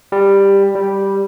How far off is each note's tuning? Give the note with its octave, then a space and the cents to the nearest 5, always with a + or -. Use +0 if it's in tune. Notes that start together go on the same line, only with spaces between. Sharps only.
G3 +10
G3 +0